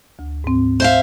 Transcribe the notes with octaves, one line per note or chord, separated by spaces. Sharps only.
D2
G#2 C4
C5 E5 F5